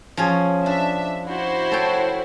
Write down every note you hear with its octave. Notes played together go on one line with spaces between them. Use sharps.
F3 C#4 G#4
D4 E5
E4 F#4 C5
A4 C#5 G5